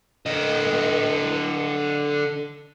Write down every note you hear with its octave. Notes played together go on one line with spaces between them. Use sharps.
D3 D#5